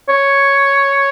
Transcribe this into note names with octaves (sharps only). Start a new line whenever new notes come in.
C#5